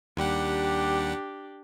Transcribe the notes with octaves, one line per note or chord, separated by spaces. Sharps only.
D#2 G3 D4 G4 F#5